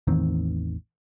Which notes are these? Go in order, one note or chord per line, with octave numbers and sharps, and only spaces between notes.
A1 E2 D#3 C4